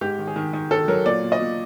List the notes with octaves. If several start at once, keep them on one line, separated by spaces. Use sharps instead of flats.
G#2 G4
D#3
G#4
D#3
D#3
D#3 A4
F#3 A#4
A#2 D5
A#2
D#5
A#2